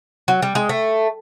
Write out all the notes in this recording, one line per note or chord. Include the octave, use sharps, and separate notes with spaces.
F#3
G3
G#3
A3